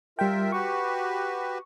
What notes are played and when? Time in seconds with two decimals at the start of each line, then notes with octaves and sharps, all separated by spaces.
0.19 G3 F4 A#4 E5 G5
0.52 F#4 G4 B4 C#6